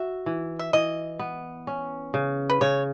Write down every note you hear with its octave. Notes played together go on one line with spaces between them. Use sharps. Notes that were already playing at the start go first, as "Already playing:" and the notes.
Already playing: F#4 E5
E3
E5
E3 D#5
B3
C#4
C#3
B4
C#3 C#5